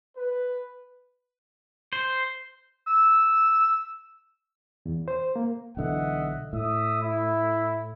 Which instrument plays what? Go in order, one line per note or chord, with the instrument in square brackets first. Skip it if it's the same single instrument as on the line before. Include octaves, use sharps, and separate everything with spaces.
[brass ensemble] B4
[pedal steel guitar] C5
[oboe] E6
[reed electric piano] E2
C5
A#3
[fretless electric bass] B1 D3 E3 [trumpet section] D#5 E5 F#5
[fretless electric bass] A2 [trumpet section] E5 D#6
[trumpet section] E4